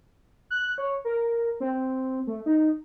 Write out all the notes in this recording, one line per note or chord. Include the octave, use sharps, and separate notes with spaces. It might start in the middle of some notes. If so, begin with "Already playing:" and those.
F#6
C#5
A#4
C4
A3
D#4